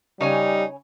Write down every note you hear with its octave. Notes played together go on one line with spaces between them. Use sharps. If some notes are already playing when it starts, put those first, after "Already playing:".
C#3 G3 D#4 C#5 G#5